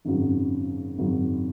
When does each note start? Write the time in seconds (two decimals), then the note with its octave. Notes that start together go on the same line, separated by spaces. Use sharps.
0.05 G#1 F#2 C#3 F#3
0.98 G#1 F#2 C#3 F#3